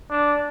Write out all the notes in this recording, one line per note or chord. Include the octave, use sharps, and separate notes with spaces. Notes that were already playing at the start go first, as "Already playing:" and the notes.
D4